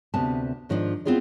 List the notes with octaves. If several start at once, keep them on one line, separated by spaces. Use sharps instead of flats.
D2 C3 B3 A5
G#2 D#3 F3 B3 D4 D#4
B3 C4 E4 F4 G#4 D5